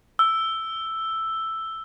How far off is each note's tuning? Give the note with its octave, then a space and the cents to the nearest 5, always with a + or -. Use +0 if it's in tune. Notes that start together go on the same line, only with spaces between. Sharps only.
E6 +5